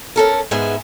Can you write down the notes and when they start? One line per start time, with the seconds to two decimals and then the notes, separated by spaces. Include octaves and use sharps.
0.16 C#4 A4 A#4
0.51 G#2 G#3 B3 E5 G#5